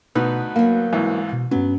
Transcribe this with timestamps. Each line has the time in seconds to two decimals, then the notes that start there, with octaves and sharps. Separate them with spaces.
0.15 D2 B2 B3 D#4 B4
0.56 F#3 A#3 F5
0.93 C2 G#2 E3
1.33 B2
1.51 G2 F#3 B3 C#4